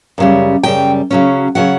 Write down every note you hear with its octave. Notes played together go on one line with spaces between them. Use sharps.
F#2 C#3 G3
F#2 C#3 G3 G5
C#3 F#3 C#4
C#3 F#3 C#4 F#5